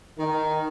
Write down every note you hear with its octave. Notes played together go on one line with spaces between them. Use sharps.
D#3